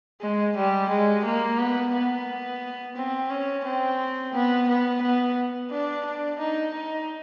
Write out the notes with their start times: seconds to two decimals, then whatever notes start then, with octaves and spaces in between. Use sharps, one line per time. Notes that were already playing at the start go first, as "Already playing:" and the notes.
0.21 G#3
0.56 G3
0.90 G#3
1.25 A#3
1.58 B3
1.92 B3
2.96 C4
3.30 C#4
3.65 C4
4.33 B3
4.68 B3
5.02 B3
5.71 D4
6.05 D4
6.40 D#4
6.74 D#4